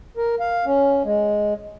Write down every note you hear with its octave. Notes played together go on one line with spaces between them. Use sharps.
A#4
F5
C#4
G#3